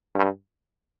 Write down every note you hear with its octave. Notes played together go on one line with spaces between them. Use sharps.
G2